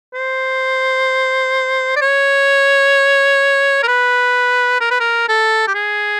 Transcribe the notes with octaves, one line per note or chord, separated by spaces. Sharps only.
C5
D5
C#5
A#4
B4
A#4
B4
A#4
A4
G4
G#4